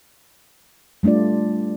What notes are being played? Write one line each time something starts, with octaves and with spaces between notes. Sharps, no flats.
G3 A3 D4 F4 D5